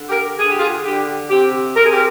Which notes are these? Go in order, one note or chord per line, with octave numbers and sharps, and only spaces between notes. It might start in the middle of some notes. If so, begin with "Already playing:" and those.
Already playing: D3
G4 A#4
D3 G#4
G4
F4 G#4
D3 G4
C3 G4
C3 A#4
G#4
G4 A#4